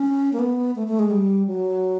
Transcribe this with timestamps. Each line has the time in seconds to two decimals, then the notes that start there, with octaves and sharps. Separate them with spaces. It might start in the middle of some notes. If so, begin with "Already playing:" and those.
Already playing: C#4
0.33 A#3
0.39 B3
0.76 A3
0.88 A3
0.99 G#3
1.10 G3
1.47 F#3